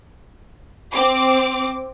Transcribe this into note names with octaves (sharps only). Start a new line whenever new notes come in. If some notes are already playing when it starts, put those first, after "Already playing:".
C4 D6